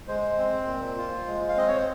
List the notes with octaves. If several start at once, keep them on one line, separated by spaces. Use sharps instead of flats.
G#3 C5
C4
A#2
F4
G#3
F5
C4 D#5
C#5
C5